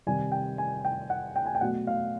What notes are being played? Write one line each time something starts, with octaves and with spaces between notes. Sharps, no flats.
C3 D#3 G3 G#5
G5
G#5
G5
F#5
G5
G#5
G5
B2 F#3 A3 F#5
F5